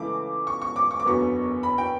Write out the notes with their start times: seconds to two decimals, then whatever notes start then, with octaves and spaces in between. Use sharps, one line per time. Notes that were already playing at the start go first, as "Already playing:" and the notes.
Already playing: C#2 C#3 E3 A3 D6
0.47 C#6
0.62 C#6
0.76 D6
0.91 C#6
1.00 D6
1.05 F#1 E2 D3 F#3 B3 C#6
1.63 B5
1.78 G5